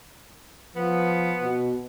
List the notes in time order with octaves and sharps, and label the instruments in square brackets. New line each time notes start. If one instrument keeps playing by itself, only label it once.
[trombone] F3 [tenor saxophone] B3
[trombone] B2